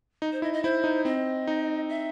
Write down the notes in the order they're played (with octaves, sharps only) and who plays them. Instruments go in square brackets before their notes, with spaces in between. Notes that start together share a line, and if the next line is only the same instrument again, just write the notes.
[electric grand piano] D#4
[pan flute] C5
[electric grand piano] E4 [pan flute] D#5
[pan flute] D#5
[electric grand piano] E4 [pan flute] C5
[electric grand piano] D#4
[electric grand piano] C4 [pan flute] D#5
[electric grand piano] D#4
[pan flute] E5